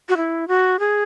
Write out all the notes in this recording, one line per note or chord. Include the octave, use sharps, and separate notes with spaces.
F#4
E4
F#4
G#4